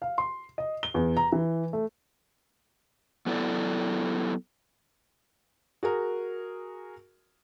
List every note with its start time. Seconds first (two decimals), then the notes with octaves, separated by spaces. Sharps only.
0.02 F5
0.18 C6
0.58 D#5
0.83 G7
0.94 E2
1.17 A#5
1.32 E3
1.73 A3
3.26 F#3 B3 E4 A4 D5
5.83 F#4 G#4 A#4